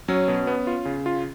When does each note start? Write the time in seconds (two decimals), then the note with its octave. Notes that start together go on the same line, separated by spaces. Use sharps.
0.08 F#3 C#4
0.28 B2
0.47 B3
0.67 F4
0.85 C#3
1.06 F4